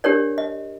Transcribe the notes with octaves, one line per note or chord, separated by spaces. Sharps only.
D4 G4 A#4 C#5 D5
D#5